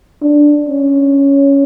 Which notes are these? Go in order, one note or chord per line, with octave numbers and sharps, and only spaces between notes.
D4
C#4